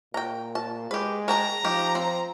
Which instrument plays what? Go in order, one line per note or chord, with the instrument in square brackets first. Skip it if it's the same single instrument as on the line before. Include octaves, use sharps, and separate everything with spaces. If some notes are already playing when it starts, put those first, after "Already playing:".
[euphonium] A#2 [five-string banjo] G5 A#5
[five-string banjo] A5
[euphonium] G#3 [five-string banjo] G4 B4
[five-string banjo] A#4 G5 A5 [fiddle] A#5
[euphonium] F3 [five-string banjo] D#4 G4
[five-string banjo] C4